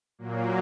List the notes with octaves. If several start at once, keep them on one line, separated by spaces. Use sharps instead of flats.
A#2 F#3 A#3